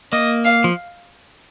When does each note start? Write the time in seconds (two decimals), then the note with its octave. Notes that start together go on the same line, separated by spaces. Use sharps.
0.12 A#3 D#5
0.45 F5
0.64 F3